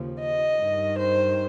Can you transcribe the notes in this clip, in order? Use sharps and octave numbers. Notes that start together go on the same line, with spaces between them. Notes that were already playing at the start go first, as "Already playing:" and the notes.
Already playing: D#2 C#3 F3
D#5
G2 D#3
C5